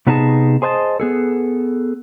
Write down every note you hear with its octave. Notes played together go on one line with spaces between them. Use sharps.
C3 B3 D4 D#4 G#4 A5
G#4 C5 D#5 G#5 A5
B3 G#4 A4